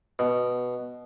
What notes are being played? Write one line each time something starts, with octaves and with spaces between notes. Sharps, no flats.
B2